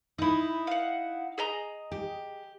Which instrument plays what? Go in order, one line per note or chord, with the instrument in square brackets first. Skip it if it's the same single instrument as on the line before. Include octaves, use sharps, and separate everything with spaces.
[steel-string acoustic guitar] D#4 E4 [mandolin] B5 D#6
[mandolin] F5 F#5
G#4 D#5 A#5
[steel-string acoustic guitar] G4